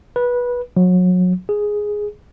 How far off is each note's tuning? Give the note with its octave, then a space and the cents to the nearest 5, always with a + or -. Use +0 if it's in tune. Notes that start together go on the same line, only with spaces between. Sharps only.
B4 -20
F#3 -30
G#4 +0